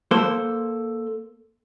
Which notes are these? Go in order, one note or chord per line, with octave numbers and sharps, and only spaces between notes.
A#3 A4 C5